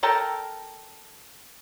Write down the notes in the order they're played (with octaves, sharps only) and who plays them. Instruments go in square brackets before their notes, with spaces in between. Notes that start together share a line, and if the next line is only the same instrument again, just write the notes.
[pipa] A4 A#4 G5 A5